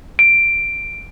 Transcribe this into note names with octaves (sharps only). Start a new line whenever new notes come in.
D7